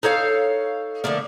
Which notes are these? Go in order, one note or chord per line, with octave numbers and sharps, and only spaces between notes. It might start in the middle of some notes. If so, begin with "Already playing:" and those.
D#4 A4 C#5 F5
D3 F3 A3 A#3